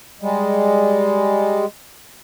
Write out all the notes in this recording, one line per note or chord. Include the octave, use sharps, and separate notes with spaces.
G3 G#3